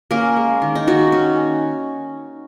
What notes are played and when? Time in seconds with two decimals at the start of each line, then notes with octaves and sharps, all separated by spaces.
0.11 A#3 C#4 A#4
0.36 G#3
0.62 D#3
0.75 D#4
0.87 D#3 F#4
1.12 C#4